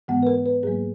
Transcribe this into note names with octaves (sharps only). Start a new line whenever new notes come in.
G#2 E3 G#3 B3 F#5
B4
A#4
B4
G#2 F#3 A#3 G#4